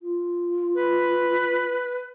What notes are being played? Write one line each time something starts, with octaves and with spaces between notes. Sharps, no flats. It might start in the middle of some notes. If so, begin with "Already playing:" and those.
F4
B4